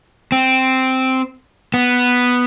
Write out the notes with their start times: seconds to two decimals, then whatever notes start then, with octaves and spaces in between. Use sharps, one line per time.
0.32 C4
1.74 B3